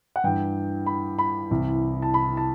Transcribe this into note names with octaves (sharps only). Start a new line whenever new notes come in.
F#5
G2 E3 G5
B5
B5
C2 C3 E3
A5
B5
A5